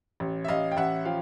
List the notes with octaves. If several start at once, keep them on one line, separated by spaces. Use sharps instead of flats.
A1
E5
A1 D#5 F5
G5
A1 E5 F#5
F3 F5 G5